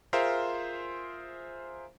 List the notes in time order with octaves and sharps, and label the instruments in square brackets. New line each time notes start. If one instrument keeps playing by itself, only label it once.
[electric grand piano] F4 G#4 A#4 C5 E5 F5